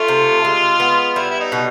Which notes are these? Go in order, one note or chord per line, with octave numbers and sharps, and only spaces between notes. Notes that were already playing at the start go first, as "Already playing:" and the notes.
Already playing: A3 F4
C3
G#3
B3
G3 E4
E4
D#4
B2